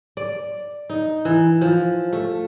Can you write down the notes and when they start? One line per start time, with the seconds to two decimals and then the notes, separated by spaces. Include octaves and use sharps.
0.17 D5
0.90 D#4
1.25 E3
1.61 F3
2.13 A3